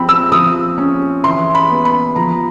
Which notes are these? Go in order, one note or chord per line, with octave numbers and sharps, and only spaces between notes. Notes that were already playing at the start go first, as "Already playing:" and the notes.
Already playing: F3 C4 B5
E6
F3 D#6
C#4
E3 C6
B5
B3
B5
F3 A#5